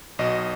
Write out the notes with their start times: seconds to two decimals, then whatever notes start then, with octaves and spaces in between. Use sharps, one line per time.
0.19 B1 B2 D#5